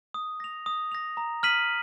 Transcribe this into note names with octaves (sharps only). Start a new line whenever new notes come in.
D#6
A#6 F7
D#6
A#6 F7
A#5
F6 B6 D#7 F#7